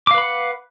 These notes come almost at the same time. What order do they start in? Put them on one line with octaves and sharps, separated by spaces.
D6 F5 B4 B5 F#5